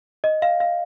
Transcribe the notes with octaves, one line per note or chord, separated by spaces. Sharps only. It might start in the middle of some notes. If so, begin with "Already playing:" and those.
D#5
F5
F5